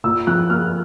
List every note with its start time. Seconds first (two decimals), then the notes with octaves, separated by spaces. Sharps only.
0.04 A#2 E6
0.27 F3 F#6
0.50 A#3 F6